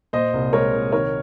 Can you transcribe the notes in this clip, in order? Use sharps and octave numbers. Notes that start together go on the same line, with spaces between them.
A#2 C5 D#5
C2
G#3 A#4 C#5
C2
D#3 A#4 C#5